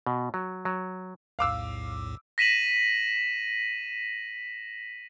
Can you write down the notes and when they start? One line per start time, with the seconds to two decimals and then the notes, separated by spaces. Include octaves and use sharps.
0.07 B2
0.34 F#3
0.65 F#3
1.39 B1 E2 A2 F5 D6 E6
2.38 A#6 B6 D#7 E7 F#7